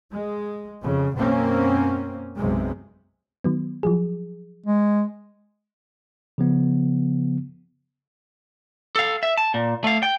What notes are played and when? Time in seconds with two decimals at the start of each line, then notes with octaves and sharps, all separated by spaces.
0.11 G#3
0.83 F2 C#3
1.15 F#2 B2 A#3 C4 C#4
2.35 B1 F#2 C3 G#3
3.44 D#3 F#3 B3
3.83 F3 F#3 G#4
4.66 G#3
6.38 C#3 F3 B3
8.96 A4 F5
9.23 E5
9.38 A5
9.54 A#2
9.84 A3 F5
10.03 G5